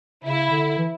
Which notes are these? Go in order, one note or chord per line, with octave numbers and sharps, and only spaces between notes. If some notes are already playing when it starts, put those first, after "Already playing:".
C#3 E4
D3
E3